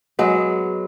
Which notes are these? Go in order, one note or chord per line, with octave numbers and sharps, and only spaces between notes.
F#3 G#3 B3